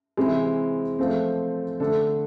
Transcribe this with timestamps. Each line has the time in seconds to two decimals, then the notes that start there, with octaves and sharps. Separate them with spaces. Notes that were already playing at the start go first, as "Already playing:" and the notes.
0.17 C3 E3 G#3 C4 E4
0.99 F3 A3 C4
1.80 D3 A3 D4 A4